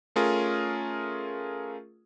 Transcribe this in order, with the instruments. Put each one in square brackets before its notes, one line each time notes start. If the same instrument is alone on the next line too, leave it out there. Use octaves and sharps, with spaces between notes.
[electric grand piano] A3 C#4 F4 G#4 A#4